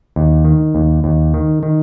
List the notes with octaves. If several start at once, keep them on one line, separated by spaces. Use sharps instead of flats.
D#2
D#3
D#2
D#2
D#3
D#3